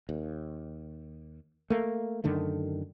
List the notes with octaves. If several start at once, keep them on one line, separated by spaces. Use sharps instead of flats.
D#2
A3 A#3
F#2 D3 D#3 A3